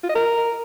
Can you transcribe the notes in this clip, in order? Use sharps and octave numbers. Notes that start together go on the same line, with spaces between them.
F4
D#5
A#4